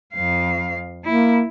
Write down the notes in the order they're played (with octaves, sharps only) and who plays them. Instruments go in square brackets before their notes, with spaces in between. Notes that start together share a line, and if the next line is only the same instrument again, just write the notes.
[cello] F2 F5
[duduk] A#3 [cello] E4